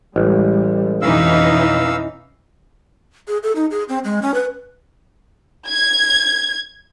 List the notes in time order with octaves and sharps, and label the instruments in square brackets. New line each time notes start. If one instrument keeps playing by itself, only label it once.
[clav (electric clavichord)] A1 [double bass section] G3 G#3
[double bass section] F2 B2 [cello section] E3 C#4 D#4 [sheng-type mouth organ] F5 E6
[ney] G#4
A4
D#4
G#4
C4
G#3
C#4
B4
[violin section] G#6